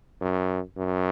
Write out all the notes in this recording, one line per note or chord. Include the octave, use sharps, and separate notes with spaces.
F#2
F#2